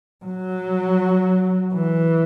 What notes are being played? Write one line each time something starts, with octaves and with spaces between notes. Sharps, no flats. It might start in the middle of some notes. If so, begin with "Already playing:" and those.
F#3
E3